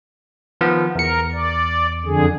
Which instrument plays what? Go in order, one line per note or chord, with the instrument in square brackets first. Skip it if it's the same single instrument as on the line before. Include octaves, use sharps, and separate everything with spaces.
[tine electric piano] D#3 F3 B3
[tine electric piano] E2 C#7 [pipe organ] A#4
[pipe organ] D5
F2 D3 G#4